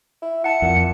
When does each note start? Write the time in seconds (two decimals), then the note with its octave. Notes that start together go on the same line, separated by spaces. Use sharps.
0.22 E4
0.44 E4 F#5 A5 C#7
0.62 F2 A#2